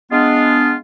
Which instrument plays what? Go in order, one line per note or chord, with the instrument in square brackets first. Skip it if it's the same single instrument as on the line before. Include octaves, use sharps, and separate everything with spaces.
[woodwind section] G#3 B3 D4 F4